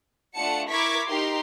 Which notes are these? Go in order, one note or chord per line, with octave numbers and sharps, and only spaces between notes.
A3 D4 F4 F#5 A5 C#7
E4 A#4 C#6 D6 G#6 B6
D#4 G4 A#4 C6